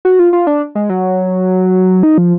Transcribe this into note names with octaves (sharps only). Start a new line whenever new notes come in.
F#4
F4
F4
D4
G#3
F#3
D#4
F3